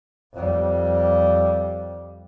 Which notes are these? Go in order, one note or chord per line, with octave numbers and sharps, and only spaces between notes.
F2 G3